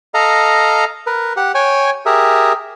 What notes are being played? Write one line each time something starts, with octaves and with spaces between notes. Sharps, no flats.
A4 D#5 F5 A#5
A#4 B4
G4 F#5
C#5 G5 G#5
G4 G#4 A#4 E5